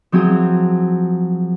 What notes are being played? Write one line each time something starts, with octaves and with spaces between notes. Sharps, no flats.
F3 F#3 C4 E4 G#4